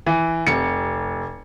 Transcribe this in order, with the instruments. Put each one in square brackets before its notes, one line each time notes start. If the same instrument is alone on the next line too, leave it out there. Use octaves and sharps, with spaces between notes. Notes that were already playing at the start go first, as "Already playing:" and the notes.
[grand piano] E3
F1 C3 C#7